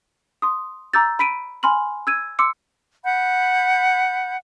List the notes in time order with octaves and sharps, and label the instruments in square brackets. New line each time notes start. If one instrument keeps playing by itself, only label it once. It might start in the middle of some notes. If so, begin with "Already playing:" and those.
[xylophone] C6 D#6
A#5 D6 E6 G6 A6
B5 B6 D7 D#7
G#5 B5 C6 F6 F#7
E6 G#6 D#7
C6 D6 E6 C#7
[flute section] F#5 B5 G6